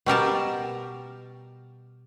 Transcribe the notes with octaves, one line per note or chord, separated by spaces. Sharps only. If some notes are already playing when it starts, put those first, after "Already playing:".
B2 G3 A#4 A5